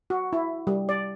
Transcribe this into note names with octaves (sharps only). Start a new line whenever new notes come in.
F#4
E4
G3
D5